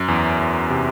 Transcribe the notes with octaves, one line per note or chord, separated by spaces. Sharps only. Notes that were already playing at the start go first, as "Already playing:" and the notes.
Already playing: F#2
E2
E2
C3